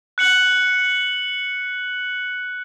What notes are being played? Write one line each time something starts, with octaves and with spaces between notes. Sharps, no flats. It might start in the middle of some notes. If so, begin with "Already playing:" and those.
F#6 C#7 F#7